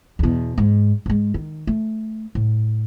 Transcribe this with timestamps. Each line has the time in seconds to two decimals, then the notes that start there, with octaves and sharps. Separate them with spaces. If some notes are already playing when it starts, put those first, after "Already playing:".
0.19 E2 B2
0.58 G#2
1.06 G#2 G#3
1.34 D#3
1.67 A3
2.35 A2